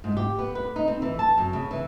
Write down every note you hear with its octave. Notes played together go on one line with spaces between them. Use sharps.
G#2
G4
B3
B4
D#4
C4
E3
A5
F#2
C#3
E3